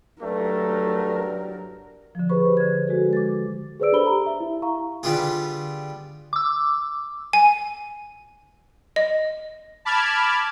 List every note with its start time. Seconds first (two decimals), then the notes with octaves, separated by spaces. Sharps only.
0.22 G2 F#3 A3 A#4
2.15 D3 F3
2.29 G4 G#4 B4 C5 B5 C#6
2.57 D3 G#6
2.88 G#3 F#4 A4
3.13 D6 A6
3.80 G#4 B4 C5 D5 E6 D7
3.92 D4 G4 A4 B5 G7
4.06 A#5
4.26 E5
4.40 E4
4.62 F5 A#5 C#6
5.03 D3 G3 B3 F4 G#4
6.33 D6 E6
7.33 G#5
8.96 D#5
9.85 A5 B5 D6 F6 G#6